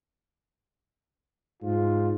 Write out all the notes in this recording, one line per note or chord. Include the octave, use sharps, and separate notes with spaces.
G#2 F4